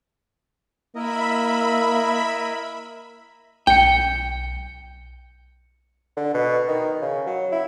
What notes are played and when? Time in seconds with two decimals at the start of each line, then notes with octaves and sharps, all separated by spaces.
0.95 A#3 E4 A#4 D#5 E5 B5
3.67 B1 G5 C#7
6.17 D3
6.34 B2
6.68 D#3
7.01 C#3
7.26 F#3
7.52 E4